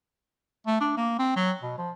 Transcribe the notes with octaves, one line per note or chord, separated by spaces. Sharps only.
A3
D4
A#3
C4
F#3
B2
F3